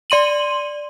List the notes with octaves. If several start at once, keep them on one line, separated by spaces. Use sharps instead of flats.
D5 C6 D#7 F#7